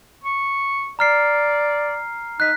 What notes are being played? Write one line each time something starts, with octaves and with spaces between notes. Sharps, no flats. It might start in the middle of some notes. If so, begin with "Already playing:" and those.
C#6
D5 A#5 F6 C7
D#4 F#6 B6